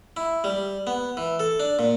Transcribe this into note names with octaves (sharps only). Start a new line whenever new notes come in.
E4
G3
B3
E3
A4
D4
A#2